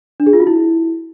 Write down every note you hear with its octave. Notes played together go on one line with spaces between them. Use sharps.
D4
G#4
F4
F#4
E4